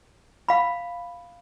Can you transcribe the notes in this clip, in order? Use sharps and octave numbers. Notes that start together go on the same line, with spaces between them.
F5 B5